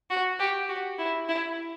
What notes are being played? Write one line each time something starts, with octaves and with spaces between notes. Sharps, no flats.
F#4
G4
F#4
E4
E4